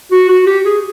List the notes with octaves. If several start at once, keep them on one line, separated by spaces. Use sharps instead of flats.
F#4
F#4
G4
G#4